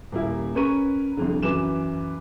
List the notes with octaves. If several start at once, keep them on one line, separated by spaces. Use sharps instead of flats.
D#1 A#3 E4
C#4 A#4 B4 C#6 D#7
C2 F2 D3
F#2 E3 B4 D6 E7